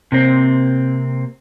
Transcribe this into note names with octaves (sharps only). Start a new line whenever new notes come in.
C3 A#3 C4